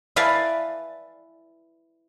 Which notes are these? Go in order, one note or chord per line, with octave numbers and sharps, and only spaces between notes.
E4 B4 D5 F5 G#5 A5